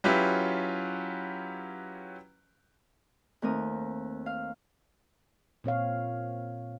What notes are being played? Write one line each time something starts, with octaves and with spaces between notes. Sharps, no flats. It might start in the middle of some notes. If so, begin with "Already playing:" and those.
F#3 C#4 E4 F4 G4 B4
D#2 A3 A#3 C4 A#4 D#6
F5
A#2 C4 C#5 F5